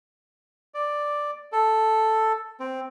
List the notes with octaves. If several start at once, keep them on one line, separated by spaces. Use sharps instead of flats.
D5
A4
C4